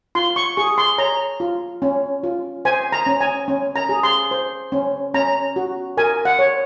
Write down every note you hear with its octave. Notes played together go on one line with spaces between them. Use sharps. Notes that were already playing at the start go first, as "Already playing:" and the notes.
F4 C6
C#6
G#4 C#6
C6
C#5 A#5
F4
C#4
F4
C5 G#5
A#5
C#4
G#5
C#4
A#5
G#4
C6
C5
C#4
C#4 A#5
F#4
A#4 G#5
F#5
C#5